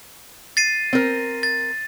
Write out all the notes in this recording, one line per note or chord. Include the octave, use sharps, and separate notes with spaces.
A6 C7 D#7
C4 A#4
A6